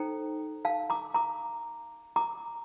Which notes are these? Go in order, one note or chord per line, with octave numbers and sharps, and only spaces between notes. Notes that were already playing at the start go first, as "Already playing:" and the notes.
Already playing: D#4 A4 C5 G5 A#5
F5 A5
A#5 D6
A#5 D6
A#5 D6